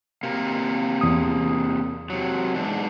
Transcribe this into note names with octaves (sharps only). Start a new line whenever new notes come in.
C3 A#3
E2 D#6
C3 F#3
E2 G#2 D4